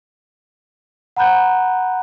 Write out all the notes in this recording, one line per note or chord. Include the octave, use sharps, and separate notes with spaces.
F#5 A#5 B5 F#6 G6